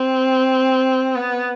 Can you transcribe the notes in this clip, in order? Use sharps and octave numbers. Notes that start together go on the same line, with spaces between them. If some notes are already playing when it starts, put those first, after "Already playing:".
Already playing: C4
B3